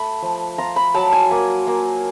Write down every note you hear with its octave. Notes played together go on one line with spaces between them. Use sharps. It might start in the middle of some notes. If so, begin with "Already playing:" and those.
Already playing: A3 B5
F3
F4 A#5
B5
F#3 A5
G#5
A#3
A#3